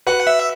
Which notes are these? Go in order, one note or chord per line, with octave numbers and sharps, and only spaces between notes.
F#4 B4 F#5
E5